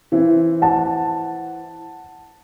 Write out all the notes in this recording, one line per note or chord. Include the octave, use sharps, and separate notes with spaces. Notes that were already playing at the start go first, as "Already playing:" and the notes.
E3 C4 E4
F#5 A5